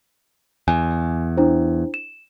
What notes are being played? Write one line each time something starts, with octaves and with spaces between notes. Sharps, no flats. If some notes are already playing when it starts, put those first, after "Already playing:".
E2 G#5
D4 E4 C5
E7